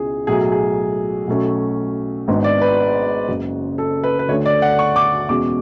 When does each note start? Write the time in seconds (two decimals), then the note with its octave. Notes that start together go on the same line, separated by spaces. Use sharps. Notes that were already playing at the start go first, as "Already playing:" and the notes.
Already playing: C#2 B2 G#3 C#4 E4 G#4
0.27 B1 A2 F#3 G#4
0.52 G#4
1.27 B1 B2 F#3 A3 C#4
2.28 G#1 G#2 G#3 B3 D4
2.44 D5
2.62 B4
3.28 F#1 F#2 C#3
3.78 A4
4.04 B4
4.19 B4
4.28 D2 D3 A3 D4 C#5
4.46 D5
4.62 F#5
4.79 C#6
4.96 D6
5.29 E2 B2 G#3 C#4 D6